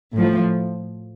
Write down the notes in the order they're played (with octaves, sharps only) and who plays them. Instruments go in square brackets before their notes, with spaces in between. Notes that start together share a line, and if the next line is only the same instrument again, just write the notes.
[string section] A2 F3